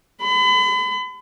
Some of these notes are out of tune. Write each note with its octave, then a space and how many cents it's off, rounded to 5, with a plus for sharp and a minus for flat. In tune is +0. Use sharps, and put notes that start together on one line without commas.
B5 +35